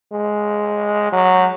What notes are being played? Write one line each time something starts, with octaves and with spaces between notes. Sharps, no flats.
G#3
F#3